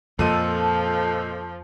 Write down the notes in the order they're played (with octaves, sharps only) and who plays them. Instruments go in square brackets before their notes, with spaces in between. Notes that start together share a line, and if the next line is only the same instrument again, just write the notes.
[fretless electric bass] F2 [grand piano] A#2 D#5 D#7 [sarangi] F3 [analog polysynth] A4